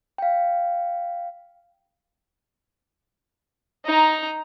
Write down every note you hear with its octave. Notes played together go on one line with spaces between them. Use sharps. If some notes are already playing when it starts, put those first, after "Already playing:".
F5 G5
D#4 A#5